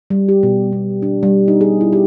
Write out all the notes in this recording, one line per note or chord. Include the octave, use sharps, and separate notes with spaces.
G3
G4
B2
B3
D4
G3
D#4
G#4
E4
G4